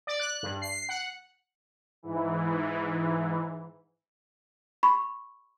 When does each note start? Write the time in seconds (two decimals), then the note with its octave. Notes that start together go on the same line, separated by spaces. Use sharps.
0.07 D5
0.20 F#6
0.43 G2
0.62 C7
0.89 F#5
2.03 G#2 E3
4.83 B5 C#6